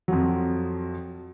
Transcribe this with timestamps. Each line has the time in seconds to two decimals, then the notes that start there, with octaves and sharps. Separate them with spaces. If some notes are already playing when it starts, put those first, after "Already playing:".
0.08 F2 F3 F#3